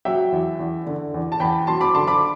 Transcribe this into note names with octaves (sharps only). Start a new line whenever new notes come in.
F#3 E5 G5
E2
E2
D3
E2
A5
E2 G5 B5
F#3 A5 C6
B5 D6
D3 A5 C6
B5 D6